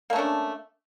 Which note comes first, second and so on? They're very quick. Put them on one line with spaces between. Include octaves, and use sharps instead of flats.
A#3 A3 C#4 D4